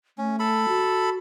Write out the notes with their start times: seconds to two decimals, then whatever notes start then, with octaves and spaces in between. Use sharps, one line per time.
0.18 A3 C#4
0.40 A4 B5
0.68 F#4